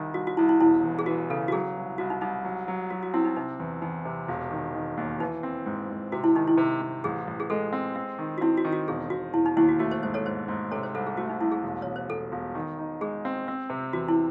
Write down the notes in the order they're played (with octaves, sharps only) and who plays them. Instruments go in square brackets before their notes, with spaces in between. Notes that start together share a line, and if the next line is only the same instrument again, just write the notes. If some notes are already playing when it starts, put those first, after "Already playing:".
Already playing: [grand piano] C2 D#3
[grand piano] C2 [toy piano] F#4
[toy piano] F#4
[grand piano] C2 [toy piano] E4
[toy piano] E4
[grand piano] E1 [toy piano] E4
[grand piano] E2
[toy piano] G#4
[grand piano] E3 [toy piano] F#4
[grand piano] C#3 [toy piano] A4
[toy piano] F#4
[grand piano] F#3 [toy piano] G#4
[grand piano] C2
[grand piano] C2 [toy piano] F#4
[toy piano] D#4
[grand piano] C2 [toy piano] D#4
[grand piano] F#3
F#3
[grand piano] F#3 [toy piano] F#4
[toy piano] F#4
[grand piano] C4 [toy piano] E4
[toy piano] D#4
[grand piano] C3 [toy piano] D#4
[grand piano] E2
[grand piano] E2 [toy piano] D#4
[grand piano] C3
E1
D#3
D#3
D#2
[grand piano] E3 [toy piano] D#4
[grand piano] C4
G#2
G#2
[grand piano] C3 [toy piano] F#4
[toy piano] E4
[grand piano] D#3 [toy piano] D#4
[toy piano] E4
[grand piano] C3
C3
[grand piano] A1 [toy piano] G#4
[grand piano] A1
[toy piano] G#4
[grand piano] G#3 [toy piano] A4
[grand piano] C4
C4
D#3
[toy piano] F#4
[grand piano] C4 [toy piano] E4
[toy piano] F#4
[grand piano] D#3
[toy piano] F#4
[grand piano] E1 [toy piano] G#4
[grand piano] E1 [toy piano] F#4
[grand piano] E1 [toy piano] E4
[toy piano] D#4
[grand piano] D#2 [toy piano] E4
[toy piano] F#4
[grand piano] A3 [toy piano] F#4
[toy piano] C5
[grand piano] G#2 [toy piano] C5
[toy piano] A4 C#5
[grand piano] G#2 [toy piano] C5
[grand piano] G#2
[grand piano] C3 [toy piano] A4 C#5
[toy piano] C5
[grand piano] C2 [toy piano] A4
[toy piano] G#4
[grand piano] A3 [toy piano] F#4
[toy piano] D#4
[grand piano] C2 [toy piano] E4
[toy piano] G#4
[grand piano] E1
[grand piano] E1 [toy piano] C#5
[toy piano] C5
[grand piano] E1 [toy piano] A4
[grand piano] E1
D#3
D#4
[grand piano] G#3 [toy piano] G#4
[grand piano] C4
C4
C3
[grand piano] E2 [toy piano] F#4
[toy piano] E4